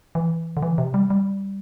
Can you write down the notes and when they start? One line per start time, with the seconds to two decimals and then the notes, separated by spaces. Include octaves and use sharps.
0.15 E3
0.57 D3
0.63 E3
0.78 C3
0.94 G3
1.10 G3